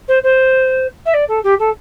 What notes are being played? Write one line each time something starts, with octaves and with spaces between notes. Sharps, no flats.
C5
C5
E5
D5
A4
G4
A4